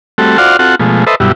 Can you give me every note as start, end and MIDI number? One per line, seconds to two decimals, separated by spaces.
0.18 0.38 55
0.18 0.38 57
0.18 0.38 60
0.18 0.38 66
0.18 0.38 69
0.38 0.57 65
0.38 0.57 66
0.38 0.57 72
0.38 0.57 74
0.38 0.57 77
0.38 0.57 78
0.59 0.75 60
0.59 0.75 65
0.59 0.75 66
0.59 0.75 69
0.59 0.75 78
0.80 1.05 47
0.80 1.05 53
0.80 1.05 56
0.80 1.05 57
1.07 1.15 69
1.07 1.15 71
1.07 1.15 72
1.07 1.15 75
1.07 1.15 76
1.20 1.32 43
1.20 1.32 47
1.20 1.32 54
1.20 1.32 55
1.20 1.32 64